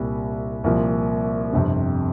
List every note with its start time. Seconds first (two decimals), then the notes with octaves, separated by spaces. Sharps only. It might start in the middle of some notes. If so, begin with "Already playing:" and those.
Already playing: C2 A#2 G3
0.64 C2 A#2 F3 A#3
1.53 G1 F2 C3